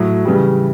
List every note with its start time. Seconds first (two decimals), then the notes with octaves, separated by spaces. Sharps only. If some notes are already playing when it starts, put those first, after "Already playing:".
Already playing: A2 F#3
0.25 C#3 E3 G3